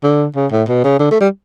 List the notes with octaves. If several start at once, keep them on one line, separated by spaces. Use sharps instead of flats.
D3
C#3
A2
B2
C#3
D3
A3
G3